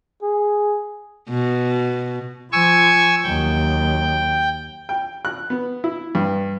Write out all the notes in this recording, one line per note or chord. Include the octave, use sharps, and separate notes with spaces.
G#4
B2
F3 G#5 C#6 E6
D#2 F#3 G5
G5
F#6
B3
E4
G2